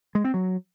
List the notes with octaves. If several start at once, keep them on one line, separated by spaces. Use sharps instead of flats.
G#3
C4
F#3